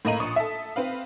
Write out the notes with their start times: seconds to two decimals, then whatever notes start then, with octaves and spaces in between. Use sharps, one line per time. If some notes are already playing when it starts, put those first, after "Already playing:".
0.05 A2 A#3 D#5 A#5 D#7 F#7
0.20 A#1 C#6 D#6
0.36 A4 E5
0.76 C4 B4 F5